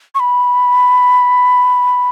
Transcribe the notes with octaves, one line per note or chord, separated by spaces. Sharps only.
C#6
B5